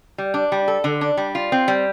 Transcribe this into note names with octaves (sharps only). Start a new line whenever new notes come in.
G3
D4
G3
A4
D3
D4
G3
F4
C4
G3